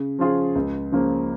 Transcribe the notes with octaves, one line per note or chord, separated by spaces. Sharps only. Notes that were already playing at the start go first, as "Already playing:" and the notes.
Already playing: C#3
F3 C#4 F4 G#4
C#2
C#3 F3 A#3 C#4